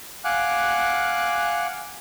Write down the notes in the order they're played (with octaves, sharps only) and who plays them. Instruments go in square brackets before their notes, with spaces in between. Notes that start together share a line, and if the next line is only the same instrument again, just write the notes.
[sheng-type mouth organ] F5 F#5 G#5 D6 F#6